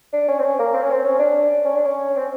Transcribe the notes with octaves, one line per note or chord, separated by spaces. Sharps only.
D4
C#4
C4
C#4
A#3
C4
C#4
C4
C#4
D4
C#4
D4
C#4
C4